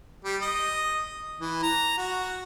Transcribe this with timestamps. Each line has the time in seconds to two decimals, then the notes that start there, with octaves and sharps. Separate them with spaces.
0.25 G3
0.42 D#5
1.40 E3
1.63 A#5
1.98 F#4